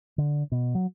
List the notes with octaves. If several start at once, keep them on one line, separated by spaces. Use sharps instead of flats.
D3
B2
F#3